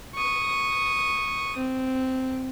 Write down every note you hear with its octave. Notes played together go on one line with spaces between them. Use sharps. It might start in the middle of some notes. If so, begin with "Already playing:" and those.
C#6 D#6
C4